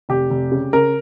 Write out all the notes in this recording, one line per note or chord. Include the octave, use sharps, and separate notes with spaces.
F1 G4
F1
C#3
C#3 A#4